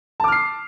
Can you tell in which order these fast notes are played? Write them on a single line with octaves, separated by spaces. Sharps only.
A5 D6 F6 C7